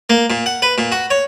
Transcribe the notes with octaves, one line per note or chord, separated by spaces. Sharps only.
A#3
A#2
F#5
B4
A#2
F#4
C#5